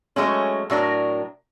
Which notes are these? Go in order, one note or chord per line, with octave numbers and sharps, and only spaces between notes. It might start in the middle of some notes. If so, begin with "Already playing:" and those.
F#3 G#3 A3 C#4
A2 F#3 D4 A#4